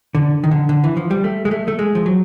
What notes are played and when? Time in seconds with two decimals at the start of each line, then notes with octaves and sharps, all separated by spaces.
0.15 D3
0.44 D#3
0.51 D3
0.69 D3
0.84 E3
0.97 F3
1.11 G3
1.24 A3
1.45 G#3
1.51 A3
1.68 A3
1.79 G#3
1.95 F3
2.06 F#3